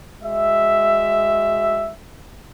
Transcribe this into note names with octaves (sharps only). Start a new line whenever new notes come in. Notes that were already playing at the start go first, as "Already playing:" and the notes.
G#3 F#4 E5